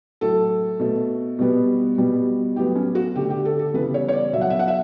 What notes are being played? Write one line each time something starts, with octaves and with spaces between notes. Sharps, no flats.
A2 F#3 A3 A4
B2 A3
B2 G3 B3
B2 G3 B3
A2 F#3 B3 G4
C#4
F#4
D3 A3 G4
G4
A4
A4
C#3 E3 G3 B3 B4
C#5
C#5
D5
B2 F#3 B3 E5
F#5
E5
F#5
E5